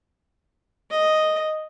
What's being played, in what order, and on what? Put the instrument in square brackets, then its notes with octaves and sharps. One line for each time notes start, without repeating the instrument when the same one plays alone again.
[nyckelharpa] D#5